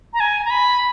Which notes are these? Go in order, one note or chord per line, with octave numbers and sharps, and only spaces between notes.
A#5
G#5
A#5
B5